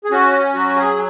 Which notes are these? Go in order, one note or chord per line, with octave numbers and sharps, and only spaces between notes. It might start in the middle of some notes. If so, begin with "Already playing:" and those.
G#4
C#4 F#4
F#3 F#4
G#4